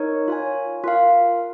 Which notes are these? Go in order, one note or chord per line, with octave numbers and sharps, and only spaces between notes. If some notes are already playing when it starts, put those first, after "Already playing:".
Already playing: D#4 A#4 C#5
F4 C#5 G#5
F4 A#4 F5